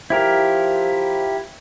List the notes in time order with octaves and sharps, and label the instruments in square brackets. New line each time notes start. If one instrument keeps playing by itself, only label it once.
[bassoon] F3 [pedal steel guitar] E4 G4 A#4